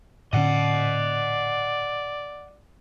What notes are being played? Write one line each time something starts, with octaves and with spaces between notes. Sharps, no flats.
A2 D3 C#4 D5 D#5 F#5